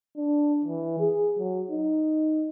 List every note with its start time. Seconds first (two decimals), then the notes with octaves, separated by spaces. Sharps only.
0.17 D4
0.65 E3
1.00 G#4
1.39 F#3
1.71 D#4